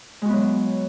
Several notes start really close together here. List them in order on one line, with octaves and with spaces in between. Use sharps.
G#3 F#4 B3 F#3